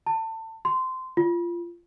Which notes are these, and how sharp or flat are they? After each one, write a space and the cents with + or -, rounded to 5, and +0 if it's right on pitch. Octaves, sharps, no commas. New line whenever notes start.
A5 +25
C6 -20
F4 -20